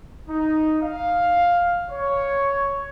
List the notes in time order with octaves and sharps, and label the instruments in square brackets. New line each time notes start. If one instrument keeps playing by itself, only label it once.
[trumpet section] D#4
F5
C#5